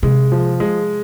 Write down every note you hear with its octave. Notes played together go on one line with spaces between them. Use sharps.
C3 G#3
F3
G#3